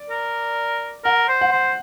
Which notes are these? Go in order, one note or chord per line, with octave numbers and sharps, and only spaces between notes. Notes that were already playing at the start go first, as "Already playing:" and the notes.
Already playing: D5
A#4
A#4 F#5
C5
F#5
C5